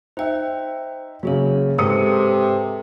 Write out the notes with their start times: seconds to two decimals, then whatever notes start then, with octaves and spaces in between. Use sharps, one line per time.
0.17 D#4 C5 E5 G5
1.23 C#3 F#3 A#3 G#4 C#5
1.78 G#2 C3 A4 B4 D#6 C#7